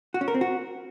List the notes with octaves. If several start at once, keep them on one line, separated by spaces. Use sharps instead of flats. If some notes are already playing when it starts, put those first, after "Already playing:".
F#4
C#4
A#4
C4
F#4